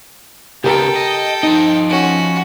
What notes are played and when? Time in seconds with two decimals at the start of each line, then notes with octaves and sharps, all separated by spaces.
0.64 C#3 B3 G4 A4 A#4 G5
0.96 D#5
1.43 F3 D#4 D#5
1.89 C#4 F#4